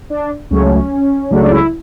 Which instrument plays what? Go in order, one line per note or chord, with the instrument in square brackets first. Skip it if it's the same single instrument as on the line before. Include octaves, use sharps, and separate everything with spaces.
[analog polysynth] D4
C#2 C#3 F#3 A3 C#4
C#2 C#3 F#3 A3 D4
D4
E4